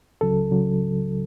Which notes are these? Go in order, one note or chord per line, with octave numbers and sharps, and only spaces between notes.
C#2 C#3 F#3 A4
C#3 F#3